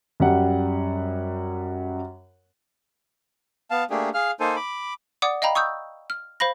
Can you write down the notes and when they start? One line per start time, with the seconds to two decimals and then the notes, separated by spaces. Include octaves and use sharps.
0.20 F#2 G3 F#5
3.70 B3 F5 A5
3.90 A3 A#3 D4 G4 G#4
4.14 G#4 F5 F6
4.40 A#3 D#4 A4 C5 G#5
4.56 B5 D6
5.22 D5 F#5 D6 D#6
5.42 D#5 F5 G5 A#5 B5
5.55 C#6 D#6 E6 G6
6.10 F6
6.40 C5 F5 B5 A#6